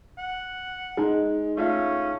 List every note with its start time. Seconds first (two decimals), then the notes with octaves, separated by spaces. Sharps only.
0.18 F#5
0.97 G#3 D#4 G#4
1.57 A3 C#4 F4 E5